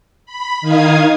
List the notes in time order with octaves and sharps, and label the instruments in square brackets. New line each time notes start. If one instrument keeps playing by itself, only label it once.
[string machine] B5
D#3 D#4 F5 D#6 G#6